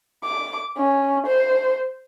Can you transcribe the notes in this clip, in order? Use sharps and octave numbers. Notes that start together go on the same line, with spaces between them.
D6
C#4
C5